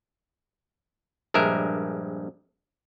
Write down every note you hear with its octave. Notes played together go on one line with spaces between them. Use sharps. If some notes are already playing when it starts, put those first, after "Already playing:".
A#1 G2 G#3 A#4 E5